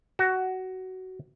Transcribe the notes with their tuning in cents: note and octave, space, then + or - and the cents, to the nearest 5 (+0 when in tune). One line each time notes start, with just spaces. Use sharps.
F#4 +15